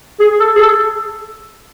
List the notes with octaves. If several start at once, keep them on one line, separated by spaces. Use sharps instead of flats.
G#4
A4
G#4
A4